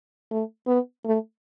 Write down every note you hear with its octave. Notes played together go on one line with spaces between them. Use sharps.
A3
B3
A3